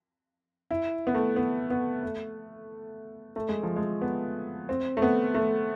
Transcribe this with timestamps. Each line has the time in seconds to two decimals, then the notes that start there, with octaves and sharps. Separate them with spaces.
0.71 E4
1.07 B3
1.15 A3
1.36 B3
1.70 B3
2.03 A3
3.36 A3
3.49 G#3
3.63 F3
3.76 G#3
4.02 B3
4.69 C4
4.97 A3
5.02 B3
5.35 A3